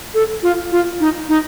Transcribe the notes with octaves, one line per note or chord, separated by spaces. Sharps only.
A4
F4
F4
D#4
D#4